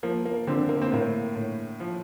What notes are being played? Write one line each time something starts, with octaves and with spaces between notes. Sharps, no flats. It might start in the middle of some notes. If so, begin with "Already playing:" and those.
F3 A#3
A#3
D3 C4
A#3
C4
A2 A#3
A2
F3